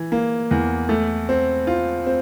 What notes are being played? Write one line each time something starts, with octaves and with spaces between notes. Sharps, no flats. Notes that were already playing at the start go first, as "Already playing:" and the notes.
Already playing: E3
A#3
E2
A3
C4
F4
C4